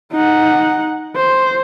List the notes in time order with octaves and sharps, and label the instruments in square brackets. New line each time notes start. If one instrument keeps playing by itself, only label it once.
[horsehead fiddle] D#4 F#5
C5